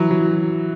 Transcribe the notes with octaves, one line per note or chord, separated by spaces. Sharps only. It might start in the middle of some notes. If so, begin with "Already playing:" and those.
Already playing: E3 F#3
F#3